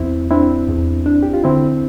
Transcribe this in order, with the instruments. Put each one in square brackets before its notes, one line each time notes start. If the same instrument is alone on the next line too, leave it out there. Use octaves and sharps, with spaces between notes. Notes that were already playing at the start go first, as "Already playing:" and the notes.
Already playing: [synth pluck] E2 [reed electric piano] C4 E4
[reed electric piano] C4 E4 [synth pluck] D4
[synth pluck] E2
D4
[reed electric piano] G4
F4
[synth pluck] D3 [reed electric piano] C4 E4